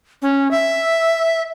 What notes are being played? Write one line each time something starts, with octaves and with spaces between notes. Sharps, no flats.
C#4
E5